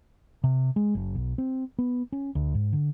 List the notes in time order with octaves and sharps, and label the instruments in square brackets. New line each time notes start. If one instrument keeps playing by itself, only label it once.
[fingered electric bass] C3
G#3
F#1
B1
C4
B3
C#4
D2
G#2
D3